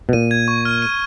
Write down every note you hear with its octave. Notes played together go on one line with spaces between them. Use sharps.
B2
A#2 D#7
G#6
C#6
F6
D#7